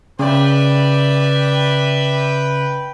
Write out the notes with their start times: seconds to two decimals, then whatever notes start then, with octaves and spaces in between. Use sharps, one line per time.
0.19 C#3 B4 D5 E5 G5